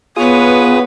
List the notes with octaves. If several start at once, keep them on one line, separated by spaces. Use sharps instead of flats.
B3 F4 G#4 B4 C#5 D#6